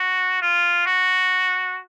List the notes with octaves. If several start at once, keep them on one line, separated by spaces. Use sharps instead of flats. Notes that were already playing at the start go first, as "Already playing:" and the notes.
Already playing: F#4
F4
F#4